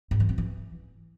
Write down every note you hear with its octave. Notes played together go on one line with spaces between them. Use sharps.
G#2
E3
C4
E3